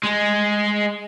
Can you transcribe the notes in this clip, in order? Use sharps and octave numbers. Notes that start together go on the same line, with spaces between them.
G#3